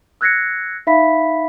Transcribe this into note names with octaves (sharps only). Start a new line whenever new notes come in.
E6 F#6 G#6 A#6 C7 C#7
D#4 E5 F5 B5 B6